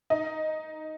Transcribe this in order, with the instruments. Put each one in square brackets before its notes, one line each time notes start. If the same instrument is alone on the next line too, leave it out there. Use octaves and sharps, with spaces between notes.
[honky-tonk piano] D#4